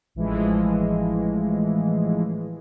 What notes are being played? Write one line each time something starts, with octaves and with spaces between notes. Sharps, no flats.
A1 A2 E3 F3 G#3